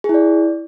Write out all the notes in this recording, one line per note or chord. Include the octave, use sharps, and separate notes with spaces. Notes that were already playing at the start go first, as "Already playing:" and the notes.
G#4
E4
D5